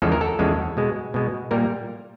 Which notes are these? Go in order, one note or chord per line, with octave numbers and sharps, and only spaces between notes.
E2 C#3 F3 G#3 A4
A#4
A4
E2 C#3 F3 G#3
B2 G#3
B2 G#3
A#2 G3 A#3 A#4